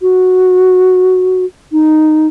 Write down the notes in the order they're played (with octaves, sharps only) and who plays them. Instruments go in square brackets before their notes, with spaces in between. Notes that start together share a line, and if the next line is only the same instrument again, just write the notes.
[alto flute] F#4
D#4